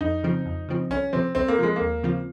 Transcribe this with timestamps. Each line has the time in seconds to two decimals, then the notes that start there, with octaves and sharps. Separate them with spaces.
0.01 F2 D#4
0.23 C#3 F3 C4
0.46 F2
0.69 C#3 F3 C4
0.90 C2 C#4
1.13 C3 F3 C4
1.35 C2 C4
1.48 A#3
1.58 C3 F3 G#3
1.76 D#2 A#3
2.03 C#3 F3 C4 F4